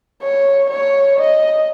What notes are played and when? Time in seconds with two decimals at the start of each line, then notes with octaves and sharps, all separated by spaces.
0.22 C#5
0.70 C#5
1.19 D#5